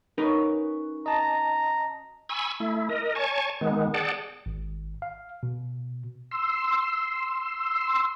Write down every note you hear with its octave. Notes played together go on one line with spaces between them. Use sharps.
C#4 D#4 F#4 A#4 B4
D#5 A5 A#5
G#5 B5 C#6 E6
A3 E4
A#4 D#5
C#5 G#5 A5 C#6
D#3 G#3 B3
G#4 D5 F#5 G5 A5
G#1
F5
B2
C6 E6